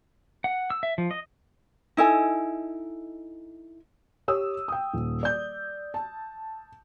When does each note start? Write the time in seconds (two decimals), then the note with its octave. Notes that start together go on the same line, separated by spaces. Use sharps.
0.44 F#5
0.70 E6
0.83 E5
0.98 F3
1.11 D#5
1.97 D#4 E4 A4 G#5
4.28 G4 C#5 D#6 E6
4.68 G5 D#6
4.93 D#1
5.23 D5 G6
5.94 A5